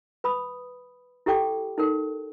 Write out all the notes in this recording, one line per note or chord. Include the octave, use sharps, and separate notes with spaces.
B4 B5 D#6
E4 G4 A4 G5 D6
D#4 A4 A#4